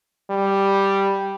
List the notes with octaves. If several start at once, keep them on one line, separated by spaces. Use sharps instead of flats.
G3